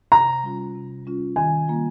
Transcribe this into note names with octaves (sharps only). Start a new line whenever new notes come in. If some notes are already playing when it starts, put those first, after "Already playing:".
C3 A#5
G3 C#4 F4
C3
G3 C#4 F4
D#3 G#5
G3 A#3 F4